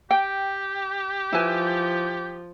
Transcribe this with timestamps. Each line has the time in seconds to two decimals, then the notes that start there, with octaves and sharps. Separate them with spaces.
0.11 G4 G5
1.33 F3 E4 B4 G#5